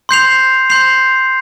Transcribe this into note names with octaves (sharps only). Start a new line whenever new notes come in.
C6 G6 C7 F7
C6 G6 C7 F7